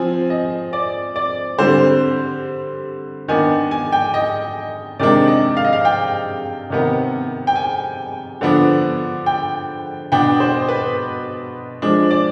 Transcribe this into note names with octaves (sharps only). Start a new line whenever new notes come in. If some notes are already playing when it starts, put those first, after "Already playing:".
Already playing: F3 C4 G#5
D#5
D5
D5
D3 G3 C4 C5
D#3 B3 D4 G#5
G#5
G5
D#5
C3 D#3 G#3 D4 D5
D#5
F5
D#5
F5
G5
C3 D#3 B3
G5
G#5
D3 F3 B3 D4
G5
B2 B3 D4 G5
C5
B4
F3 G#3 D4
D5